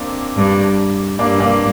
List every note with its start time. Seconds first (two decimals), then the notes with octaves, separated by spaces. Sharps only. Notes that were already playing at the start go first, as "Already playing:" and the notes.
Already playing: A#3 C4 D4
0.36 G2
1.19 G2 A#3 D4
1.40 A#3 D4